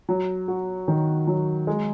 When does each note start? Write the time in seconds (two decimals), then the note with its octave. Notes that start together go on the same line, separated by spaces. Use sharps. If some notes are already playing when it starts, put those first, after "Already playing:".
0.09 F#3
0.48 F#4
0.88 D#3
1.27 F#3
1.67 G#3